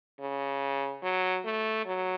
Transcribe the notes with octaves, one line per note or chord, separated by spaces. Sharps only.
C#3
F#3
A3
F#3